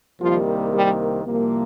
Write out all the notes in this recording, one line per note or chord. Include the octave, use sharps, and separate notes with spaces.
C2 C3 D#3 F3 G3 A#3 F4
G3 G4
C2 C3 F3 A#3